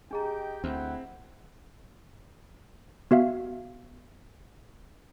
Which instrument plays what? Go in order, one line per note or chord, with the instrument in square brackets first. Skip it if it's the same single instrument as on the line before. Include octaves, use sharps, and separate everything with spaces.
[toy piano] D4 G#4 A#5 [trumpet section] G4 D#5 G5
[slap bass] D2 [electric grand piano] C4 [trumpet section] E4 F#5 G5
[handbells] B3 F#4 E5 F5